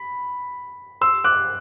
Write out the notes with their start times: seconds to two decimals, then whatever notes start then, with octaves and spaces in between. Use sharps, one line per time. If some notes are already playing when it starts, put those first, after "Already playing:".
Already playing: B5
1.01 C6 E6
1.24 D6 F#6